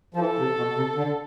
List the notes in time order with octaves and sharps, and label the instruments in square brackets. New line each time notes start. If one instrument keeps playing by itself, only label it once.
[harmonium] F3
[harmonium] E3 [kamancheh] A4
[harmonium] C3
B2
C3
D3